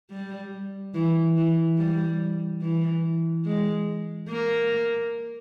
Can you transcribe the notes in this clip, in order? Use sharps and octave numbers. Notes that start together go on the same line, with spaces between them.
G3
E3
E3
G3
E3
G#3
A#3